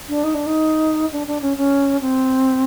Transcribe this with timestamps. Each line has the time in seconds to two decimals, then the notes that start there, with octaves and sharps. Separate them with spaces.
0.09 D4
0.24 D#4
0.34 D4
0.46 D#4
1.12 D4
1.27 D4
1.42 C#4
1.57 C#4
2.01 C4